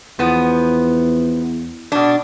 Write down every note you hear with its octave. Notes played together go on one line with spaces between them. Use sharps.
E2 F3 B3
B2 D4